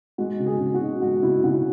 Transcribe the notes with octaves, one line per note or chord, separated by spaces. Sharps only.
G#3 F#4
C#3
G#4
C#3
F#4
D#4
G#3 F#4
C#3 E4
C#3 F#4